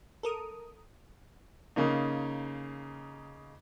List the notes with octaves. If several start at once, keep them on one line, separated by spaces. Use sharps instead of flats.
A4 A#4 D#6
C#3 A#3 D#4